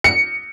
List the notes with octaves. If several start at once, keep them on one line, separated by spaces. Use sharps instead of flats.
C#7